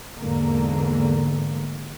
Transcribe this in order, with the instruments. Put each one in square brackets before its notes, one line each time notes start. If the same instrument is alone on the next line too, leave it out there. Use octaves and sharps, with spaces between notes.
[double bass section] E2 G#2 D3 A#3